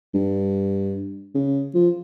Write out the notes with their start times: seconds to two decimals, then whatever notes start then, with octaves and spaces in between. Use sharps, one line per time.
0.14 G2
1.35 C#3
1.74 F3